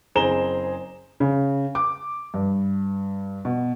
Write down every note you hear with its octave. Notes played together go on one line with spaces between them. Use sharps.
F#1 C4 G#4 A#5 E7 G7
C#3
D6
G2
B2